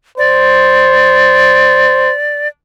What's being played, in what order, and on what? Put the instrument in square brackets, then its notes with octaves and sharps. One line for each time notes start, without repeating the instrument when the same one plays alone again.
[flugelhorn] C5 [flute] D5